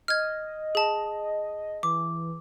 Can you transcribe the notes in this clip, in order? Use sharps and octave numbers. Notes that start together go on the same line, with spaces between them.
D#5 F6 G#6
G#4 A5
E3 D6